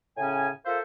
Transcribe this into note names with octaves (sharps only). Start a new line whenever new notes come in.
A2 C#3 C#4 G#5
F4 A4 A#4 C5 E5 F5